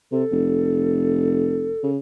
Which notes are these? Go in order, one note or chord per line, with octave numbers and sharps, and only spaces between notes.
C3 A4
F1
C#3